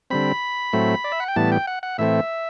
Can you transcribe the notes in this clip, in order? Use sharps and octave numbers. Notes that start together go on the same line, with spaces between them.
D3 G3 C4 B5
A2 F#3 A3 C4
D5
E5
F#5
G5
A2 E3 G3 B3 A5
G5
F#5
F#5
A2 E3 A3 C4 E5